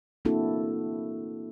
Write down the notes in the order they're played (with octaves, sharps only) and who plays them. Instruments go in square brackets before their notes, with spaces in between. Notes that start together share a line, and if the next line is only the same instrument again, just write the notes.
[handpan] A#3 C4 D4 E4 F#4 A4